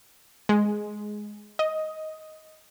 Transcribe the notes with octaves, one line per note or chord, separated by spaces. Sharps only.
G#3
D#5